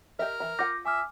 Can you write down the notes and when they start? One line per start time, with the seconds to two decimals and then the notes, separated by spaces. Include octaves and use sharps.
0.19 G4 A#4 D#5 E5
0.40 E3 E5 A#5
0.59 F4 F#5 D6 G6 A#6
0.85 E5 G#5 D6 F6